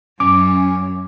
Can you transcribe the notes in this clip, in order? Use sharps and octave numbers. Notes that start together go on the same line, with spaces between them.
F#2 C#4 D6